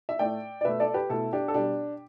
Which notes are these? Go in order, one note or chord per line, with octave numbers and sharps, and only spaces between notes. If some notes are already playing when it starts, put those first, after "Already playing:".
E5
A2 A3 D5 G5
D5
B2 A3 B4 E5
A4 D5
G4 B4
B2 A3 E4 A4
D4 G4
A4
B2 G3 D4 G4